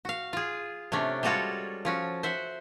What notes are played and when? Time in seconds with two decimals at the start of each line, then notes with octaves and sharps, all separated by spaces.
0.05 F#4 F5
0.33 F4 G#4
0.92 C3 A3 C#4 D4
1.23 G3 G#3 F4 F#4 A4 C#5
1.85 F3 C#4 F#4
2.23 C5 E5 F#5